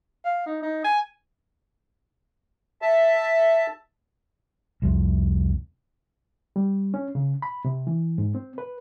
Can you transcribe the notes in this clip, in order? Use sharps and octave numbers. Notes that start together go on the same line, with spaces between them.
F5
D#4
D#4
G#5
E5 A5
C2 F2 C3
G3
C#4
C#3
B5
C3
E3
G#2
C4
B4